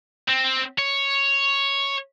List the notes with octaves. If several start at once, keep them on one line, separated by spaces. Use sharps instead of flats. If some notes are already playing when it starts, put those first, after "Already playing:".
C4
C#5